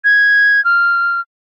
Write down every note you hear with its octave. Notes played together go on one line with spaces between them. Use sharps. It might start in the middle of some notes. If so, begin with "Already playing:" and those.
G#6
F6